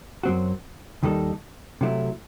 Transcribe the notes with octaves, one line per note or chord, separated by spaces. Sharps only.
F#2 F#3 C4 F#4
D#2 D#3 G3 D#4 A4
C3 F#3 A3 E4